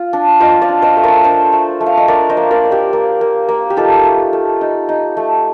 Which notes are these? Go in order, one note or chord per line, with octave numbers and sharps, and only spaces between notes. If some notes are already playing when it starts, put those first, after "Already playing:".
Already playing: F4
D4
F4 C5 D#5
D5 F5
D4
C5 D#5
A3
A#4 D5
D4 A4 C5
A3
A3
F5
D#5
D4 A#4 D5
C5 D#5
A#3
A#4 D5
A#3
G4 A#4
A#3
A#3
A#3
G4
D#4 F4 A4
A3
A3
D#4
D#4
A3